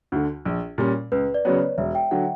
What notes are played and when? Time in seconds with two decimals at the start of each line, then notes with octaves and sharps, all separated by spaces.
0.12 D2 D3
0.45 A#1
0.78 A#2 G3 C#4
1.12 C#2 B4
1.34 D5
1.45 C#3 F#3 B3 C#5
1.78 E1 E5
1.95 G5
2.11 D3 F#3 F#5